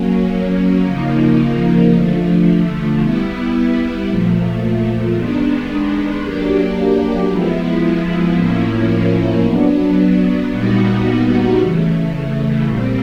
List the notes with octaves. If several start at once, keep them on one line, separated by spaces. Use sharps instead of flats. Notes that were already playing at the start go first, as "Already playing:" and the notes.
Already playing: F#3 A#3 C#4
C#3 F3 A#3 D#4
D3 F3 A3
G3 B3 E4
A#2 F3 A3
D#3 G#3 B3 D4
F#3 A#3 D4 G4
F3 G#3 B3 E4
A2 F3 A#3 C#4 E4
F#3 B3 D4
A#2 G3 B3 D#4 F#4
C#3 E3 A3
A#2 G3 C4